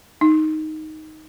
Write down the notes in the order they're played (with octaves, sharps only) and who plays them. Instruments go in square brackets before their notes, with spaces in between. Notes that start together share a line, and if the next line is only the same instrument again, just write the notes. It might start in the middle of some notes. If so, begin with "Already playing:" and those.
[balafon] D#4